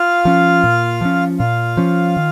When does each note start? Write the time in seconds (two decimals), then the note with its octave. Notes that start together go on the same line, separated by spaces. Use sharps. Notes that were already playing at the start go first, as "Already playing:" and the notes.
Already playing: F4 F5
0.25 F3 C#4
0.64 A#2
1.01 F3 C#4
1.39 A#2 F4 F5
1.77 F3 C#4
2.17 D#3